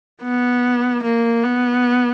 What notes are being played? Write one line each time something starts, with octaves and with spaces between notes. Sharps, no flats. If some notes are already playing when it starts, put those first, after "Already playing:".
B3
A#3
B3